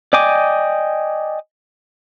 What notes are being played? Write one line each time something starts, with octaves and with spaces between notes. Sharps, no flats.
D5 D#5 G5 G#5 D6